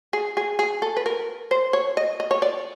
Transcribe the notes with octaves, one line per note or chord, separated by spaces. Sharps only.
G#4
G#4
G#4
A4
B4
A#4
C5
C#5
D#5
D#5
C#5
D5